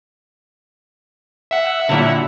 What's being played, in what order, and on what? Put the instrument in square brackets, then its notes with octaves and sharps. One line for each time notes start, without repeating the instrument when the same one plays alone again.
[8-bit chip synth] E5 F#5
[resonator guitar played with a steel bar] A#2 D3 [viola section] F#3 G3 E4